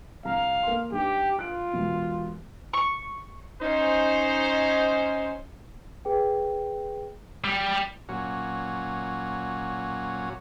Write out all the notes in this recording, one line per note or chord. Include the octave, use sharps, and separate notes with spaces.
C2 F5 A#5
A#3 C6
G2 D#4 G4
F4 F#6 D7
E1 B2
C#6
C#4 D#4 C5
G#4 B4 G5
G3
A#2 F#3 C#4 F#4